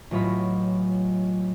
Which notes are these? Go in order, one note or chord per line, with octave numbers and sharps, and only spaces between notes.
A1 F#3 F4 C#5 D#5 B5